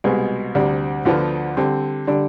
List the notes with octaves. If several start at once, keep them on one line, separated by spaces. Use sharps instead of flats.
C2 B2 G#3 B3
D2 C3 G3 D4
D2 D3 F3 B3 F4
D3 G3 C4
D3 G3 D4